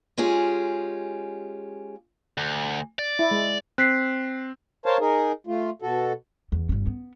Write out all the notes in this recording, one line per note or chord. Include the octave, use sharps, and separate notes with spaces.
G#3 C#4 F4 G4 G#4
D2
D5
E4
G#3
C4 F#6 B6 C7
A#4 C5 C#5 F5 A5
D#4 G#4 A#4
A3 F4
B2 F#4 A4
E2
G1 C#4
B3